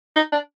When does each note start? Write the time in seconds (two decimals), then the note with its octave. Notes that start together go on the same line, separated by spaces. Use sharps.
0.16 D#4
0.32 D4